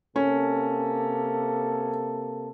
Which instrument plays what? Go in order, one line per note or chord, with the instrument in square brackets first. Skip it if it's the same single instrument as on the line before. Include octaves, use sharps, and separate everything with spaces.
[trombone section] C3 A#3 A4 [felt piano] C#4